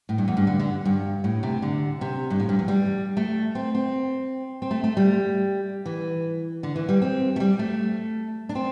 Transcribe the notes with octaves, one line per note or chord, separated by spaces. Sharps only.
A2
G2
E2
G2
D3
D3
G2
A2
C3
D3
C3
G2
A2
G2
E2
G3
A3
C4
C4
C4
A3
A3
G3
E3
D3
E3
G3
C4
A3
G3
A3
D4
C4